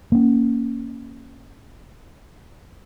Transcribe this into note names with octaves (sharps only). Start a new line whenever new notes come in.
A#3 C#4